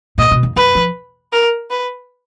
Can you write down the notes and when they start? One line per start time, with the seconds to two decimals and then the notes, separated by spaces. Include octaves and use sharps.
0.18 A#2 D#5
0.31 B2
0.43 F2
0.56 F#2 B4
0.75 F3
1.33 A#4
1.70 B4